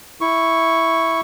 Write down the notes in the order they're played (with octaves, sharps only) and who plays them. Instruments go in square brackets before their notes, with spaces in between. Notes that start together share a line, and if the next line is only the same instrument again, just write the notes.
[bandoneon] E4 C#6